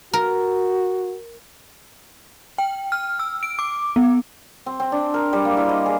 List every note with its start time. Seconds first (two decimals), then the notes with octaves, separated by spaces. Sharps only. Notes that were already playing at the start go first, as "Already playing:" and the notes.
0.14 F#4 A#4
2.58 G5
2.92 F6
3.19 E6
3.43 D7
3.59 D6
3.96 B3
4.66 C4
4.80 C4
4.92 D4
5.14 A#4
5.33 G3
5.45 A#3
5.57 E4
5.69 D#5
5.86 G#4